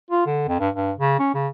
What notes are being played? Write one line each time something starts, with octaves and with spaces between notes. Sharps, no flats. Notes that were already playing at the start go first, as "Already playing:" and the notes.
F4
D3
F2
G2
G2
C#3
C#4
C#3